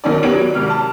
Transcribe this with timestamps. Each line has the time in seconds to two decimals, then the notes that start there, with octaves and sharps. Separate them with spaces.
0.04 B1 D#3 C#4 D5
0.23 B3 G4 C#5 D7 F#7
0.34 F#3
0.55 G#1 C3 F6
0.70 A5